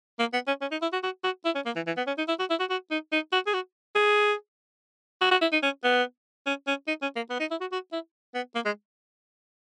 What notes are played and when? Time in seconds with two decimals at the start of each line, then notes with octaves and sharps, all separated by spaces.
0.19 A#3
0.33 B3
0.47 C#4
0.61 C#4
0.71 D#4
0.82 E4
0.93 F#4
1.03 F#4
1.23 F#4
1.45 E4
1.55 C#4
1.65 A#3
1.75 E3
1.86 E3
1.97 B3
2.07 C#4
2.18 D#4
2.28 E4
2.39 F#4
2.50 E4
2.59 F#4
2.70 F#4
2.91 D#4
3.12 D#4
3.32 F#4
3.46 G#4
3.53 F#4
3.95 G#4
5.21 F#4
5.31 F#4
5.41 E4
5.52 D#4
5.63 C#4
5.84 B3
6.46 C#4
6.67 C#4
6.87 D#4
7.02 C#4
7.16 A#3
7.30 B3
7.40 D#4
7.50 E4
7.61 F#4
7.72 F#4
7.92 E4
8.34 B3
8.55 A#3
8.65 G#3